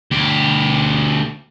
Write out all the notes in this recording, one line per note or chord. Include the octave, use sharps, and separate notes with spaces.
D2 G4